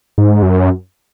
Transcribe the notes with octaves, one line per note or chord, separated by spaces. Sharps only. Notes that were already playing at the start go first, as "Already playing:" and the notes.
G#2
F#2